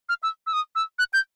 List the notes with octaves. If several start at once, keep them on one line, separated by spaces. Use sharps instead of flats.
F6
E6
E6
D#6
E6
F#6
G6